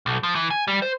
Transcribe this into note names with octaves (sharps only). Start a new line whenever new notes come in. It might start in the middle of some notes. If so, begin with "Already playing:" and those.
B1
F3
E3
G#5
G3
C5